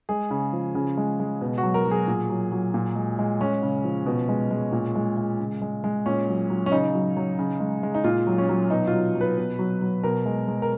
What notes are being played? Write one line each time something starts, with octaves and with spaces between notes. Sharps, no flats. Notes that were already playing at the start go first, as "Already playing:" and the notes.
G#3 G#4
C#3
F3
C#3
G#3
G#3
B2
F#4
F#3
A#4
F#3
G#4
A#2
F#3
F#3
A#2
G#3
G#3
G#3 C#4
C#3
F3
B2
G#3
G#3
A#2
G#3
G#3
C#3
G#3
G#3
A#2 C#4
F#3
F#3
C#4
C#3 D#4
F#3
F#3
C#3
G#3
G#3
D#4
A#2 F4
F#3
C#4
F#3
B2 D#4
F4
F#3
F#3
B4
B2
F#3
F#3
B2 A#4
G#3
G#3
A#4